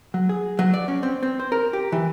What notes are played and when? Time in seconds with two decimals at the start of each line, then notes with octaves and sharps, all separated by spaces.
0.14 F#3
0.29 G#4
0.59 F#3
0.74 D5
0.88 C#4
1.03 C4
1.23 C4
1.40 C5
1.52 A#4
1.73 G4
1.92 E3